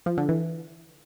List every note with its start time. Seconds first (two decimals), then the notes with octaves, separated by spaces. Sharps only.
0.06 F3
0.17 D3
0.29 E3